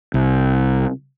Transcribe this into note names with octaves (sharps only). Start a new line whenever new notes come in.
C2